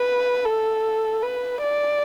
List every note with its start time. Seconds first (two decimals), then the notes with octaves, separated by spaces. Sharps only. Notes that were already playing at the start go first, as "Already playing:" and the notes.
Already playing: B4
0.45 A4
1.23 B4
1.62 D5